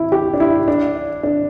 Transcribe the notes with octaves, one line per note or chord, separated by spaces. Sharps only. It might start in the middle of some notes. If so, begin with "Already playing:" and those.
Already playing: E4
G4
D4
E4
D4
D4